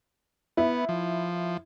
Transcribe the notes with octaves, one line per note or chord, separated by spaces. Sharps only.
B3 E4
F3